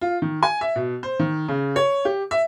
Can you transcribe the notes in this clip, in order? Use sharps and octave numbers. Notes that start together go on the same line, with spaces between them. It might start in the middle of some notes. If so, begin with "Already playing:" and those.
F4
D#3
G#5
E5
B2
C5
D#3
C#3
C#5
G4
E5